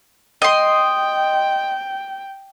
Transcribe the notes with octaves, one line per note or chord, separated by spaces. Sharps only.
D#5 G5 C6